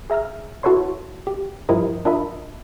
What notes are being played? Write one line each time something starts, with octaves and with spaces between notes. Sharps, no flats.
G#4 E5 A#5 E6 F6
E4 F#4 A4 B4 C#5 C6
G4
G2 F3 E4 G4 A#4 D#5
D4 F4 A#4 D#5 E5 B5